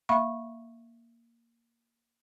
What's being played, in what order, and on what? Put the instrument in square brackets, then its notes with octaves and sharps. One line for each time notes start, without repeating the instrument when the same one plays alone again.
[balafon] A#3 E5 F5 B5 C#6